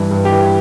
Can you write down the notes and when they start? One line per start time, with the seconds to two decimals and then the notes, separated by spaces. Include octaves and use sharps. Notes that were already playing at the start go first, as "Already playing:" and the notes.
Already playing: G2 E3
0.11 G2
0.25 G4
0.32 E3